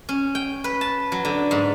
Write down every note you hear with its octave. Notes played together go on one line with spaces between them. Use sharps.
C#4
G5
B4
A5
F#3
D3
G#2